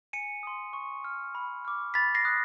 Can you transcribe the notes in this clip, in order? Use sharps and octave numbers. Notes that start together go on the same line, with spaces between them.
G#5 C#7 D#7
C6 D#6
C#6
F6
B5
D6 F6
B5 A6 B6
A#6 C7
D#6 F#6